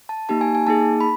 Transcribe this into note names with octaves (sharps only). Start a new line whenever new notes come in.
A5
A#3 D#4 G4 A5
G#5
G#5
A#3 D#4 G#4 A5
B5